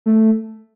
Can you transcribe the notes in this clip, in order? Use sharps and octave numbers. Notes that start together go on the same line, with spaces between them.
A3